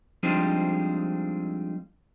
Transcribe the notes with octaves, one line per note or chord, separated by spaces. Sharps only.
F3 G3 G#3 C4 D4 D#4